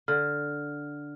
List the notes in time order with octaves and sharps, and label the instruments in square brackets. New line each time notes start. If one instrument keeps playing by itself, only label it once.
[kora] D3 [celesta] F6